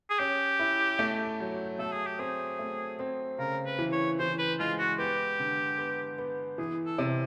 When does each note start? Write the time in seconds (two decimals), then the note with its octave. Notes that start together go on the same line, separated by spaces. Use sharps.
0.10 G#4
0.19 C#4 G4
0.59 E4
0.99 A3
1.40 F#3
1.79 A3 A4
1.92 G#4
2.07 G4
2.19 C4 G#4
2.59 A3
2.99 C4
3.39 C#3 A#4
3.66 B4
3.79 E3
3.92 C#5
4.19 E3 C5
4.39 B4
4.59 G#3 F4
4.79 F#4
4.98 B3 G4
5.40 D3
5.78 B3
6.18 B3
6.58 E3 G#4
6.86 A4
6.98 C3